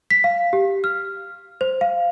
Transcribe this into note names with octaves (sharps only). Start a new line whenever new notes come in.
B6
F5
G4
F6
C5
F5